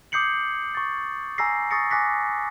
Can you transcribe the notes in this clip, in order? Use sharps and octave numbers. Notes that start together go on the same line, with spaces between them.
D6 D#6 G6 C7 C#7 F#7
C#6 A6
G#5 A#5 E6 A#6 C7
C#6 D#6 A6 A#6 C#7
G#5 D6 F#6 A#6 B6